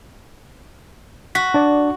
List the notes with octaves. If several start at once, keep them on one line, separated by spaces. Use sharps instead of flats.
F#4 B6
D4 D5